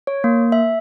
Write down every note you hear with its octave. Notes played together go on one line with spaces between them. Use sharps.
C#5
A#3
E5